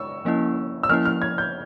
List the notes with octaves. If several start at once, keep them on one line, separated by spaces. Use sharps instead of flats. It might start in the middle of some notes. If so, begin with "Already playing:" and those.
Already playing: C#6 E6
F3 A#3 C#4 E4
E6
F3 A#3 C#4 E4 F6
F6
G#6
G6